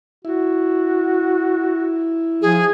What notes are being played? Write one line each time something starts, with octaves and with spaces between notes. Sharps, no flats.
E4 F#4
F3 G#4